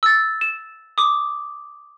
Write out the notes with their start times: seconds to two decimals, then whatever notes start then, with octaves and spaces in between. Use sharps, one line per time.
0.03 E6 A6
0.41 E7
0.98 D6 D#6